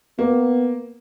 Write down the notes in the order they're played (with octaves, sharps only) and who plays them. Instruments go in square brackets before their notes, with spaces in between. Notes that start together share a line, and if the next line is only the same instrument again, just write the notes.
[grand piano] A#3 [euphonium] B3